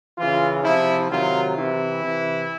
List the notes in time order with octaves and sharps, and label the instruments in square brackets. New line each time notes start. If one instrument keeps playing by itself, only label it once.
[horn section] C#3 E3 F4
C3 F3 E4
C3 D#3 F#3 F4
C3 E3 E4
C3 E3